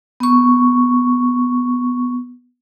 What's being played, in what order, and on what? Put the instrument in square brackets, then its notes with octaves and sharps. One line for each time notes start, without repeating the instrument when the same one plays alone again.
[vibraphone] B3 C#6